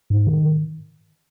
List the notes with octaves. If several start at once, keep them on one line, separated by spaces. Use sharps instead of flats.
G#2
D#3